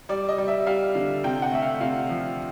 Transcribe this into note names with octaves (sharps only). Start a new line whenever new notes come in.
G3 D5
D#5
G3
E5
G3 F5
D3
C3 G5
F#5
A3 E5
F5
C3 F5
F3